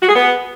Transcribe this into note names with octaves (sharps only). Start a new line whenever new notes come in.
F#4
G#4
B3